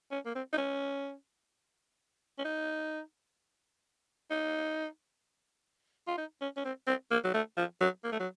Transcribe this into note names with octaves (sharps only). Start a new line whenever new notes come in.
C#4
A#3
C4
D#4
C#4
C#4
D#4
D#4
F4
D#4
C#4
C#4
C4
C4
A#3
F#3
A3
F3
F#3
A#3
A3
F#3